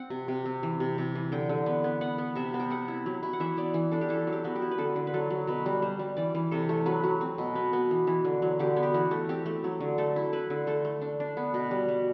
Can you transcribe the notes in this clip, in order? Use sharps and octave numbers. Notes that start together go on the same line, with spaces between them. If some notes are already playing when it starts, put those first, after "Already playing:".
Already playing: C4 F#5
C3
C3
C4
E3
C3
C3
E3
D3 G5
D3
B3
B3
B3 F#5
B3
C3 E5
B3
G5
C4 F#5
E4
F#3
E4
F#5
E3 E5
B3 D5
E3
D4 A4
G4
E4 A4
F#3
G4
B3 F#4
G4
E4
B4
D3 A4
D3
B4
F#3 A4
F#3
B2 B4
G3
G3 C5
G3
E3 D5
E3
C3 A4
A3
F#3 B4
F#3
C4
B2
B3
B3
E3
E3
D3
F#3
D3 G4
B3
G4
E3 F#4
A3
C4 G4
A3
F#3
D3
A3 A4
E4
E4 B4
D3
A3 A4
A3
D4
D4
B3
B2
G3
G3